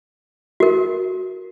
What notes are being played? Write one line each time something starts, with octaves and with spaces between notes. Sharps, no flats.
F#4 A#4